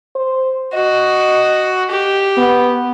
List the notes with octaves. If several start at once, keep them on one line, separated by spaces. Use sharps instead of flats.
C5
F#4 D#5
G4
B3